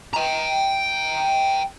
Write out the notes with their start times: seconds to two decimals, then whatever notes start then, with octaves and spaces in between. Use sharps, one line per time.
0.14 G5 A#5